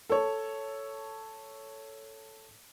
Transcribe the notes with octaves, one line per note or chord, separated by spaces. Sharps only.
A4 C#5